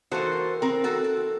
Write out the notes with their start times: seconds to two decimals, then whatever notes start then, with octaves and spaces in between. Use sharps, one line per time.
0.11 E3 A#3 D#4 F#4 A4 C5
0.62 C4 A#4
0.84 C4 F#4 A4 A5
1.04 A5